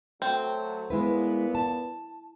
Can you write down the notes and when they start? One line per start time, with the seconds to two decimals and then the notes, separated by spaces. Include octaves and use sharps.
0.22 F#3 A3 C4
0.90 A#2 G#3 B3 E4 B4
1.55 A5